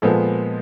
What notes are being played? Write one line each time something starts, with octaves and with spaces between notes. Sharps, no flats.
A#2 F3 G#3 B3 A4